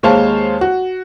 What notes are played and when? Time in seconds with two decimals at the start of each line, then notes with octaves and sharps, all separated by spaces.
0.03 D#2 G#3 C5 C#5 F5 A5
0.61 F#4